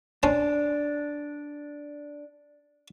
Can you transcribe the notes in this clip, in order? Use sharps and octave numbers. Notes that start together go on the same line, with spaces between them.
C#4 D4 C5 A5